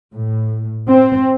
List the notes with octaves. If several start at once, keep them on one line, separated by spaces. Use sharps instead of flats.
A2
C4